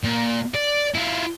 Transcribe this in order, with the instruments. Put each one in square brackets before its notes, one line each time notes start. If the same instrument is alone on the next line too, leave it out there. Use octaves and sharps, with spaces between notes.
[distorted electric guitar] A#2
D5
E4 F4